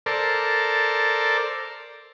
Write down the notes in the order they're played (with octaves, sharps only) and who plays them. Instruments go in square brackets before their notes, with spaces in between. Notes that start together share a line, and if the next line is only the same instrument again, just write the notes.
[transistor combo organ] A4 A#4 C5 D5